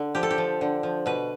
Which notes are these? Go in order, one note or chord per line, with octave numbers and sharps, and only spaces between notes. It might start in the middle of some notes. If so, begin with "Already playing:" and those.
Already playing: D3
F3 G4
A4
G4
F3
D3
F3
B2 B4